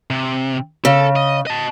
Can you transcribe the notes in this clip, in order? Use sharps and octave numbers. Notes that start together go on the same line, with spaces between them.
C3
C#3 A4
D#5
D#5 A5